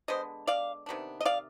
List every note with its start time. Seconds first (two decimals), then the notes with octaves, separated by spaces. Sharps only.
0.08 D3 G#3 B3 D4 C5 D#5
0.47 D5 F5
0.86 C3 D#3 B3 D4
1.21 D#5
1.25 D5 F5